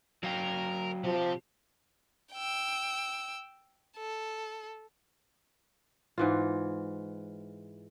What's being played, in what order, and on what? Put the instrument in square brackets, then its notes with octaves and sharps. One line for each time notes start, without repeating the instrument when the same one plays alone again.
[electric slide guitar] F#3 F5 G5 [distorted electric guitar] A#4
[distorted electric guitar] C3 G4 [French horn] F3
[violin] G5 E6
A4
[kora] G#2 E3 F4